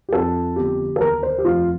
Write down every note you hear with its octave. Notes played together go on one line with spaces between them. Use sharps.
G4
F2 A4
G1 G4
A4
D#2 A#4
C5
G4
F1 F4